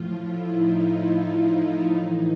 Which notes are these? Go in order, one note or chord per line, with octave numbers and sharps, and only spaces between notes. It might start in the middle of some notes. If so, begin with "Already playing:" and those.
Already playing: A2 F3 F4
E4
D#4
F4
E4
A2 E3 D#4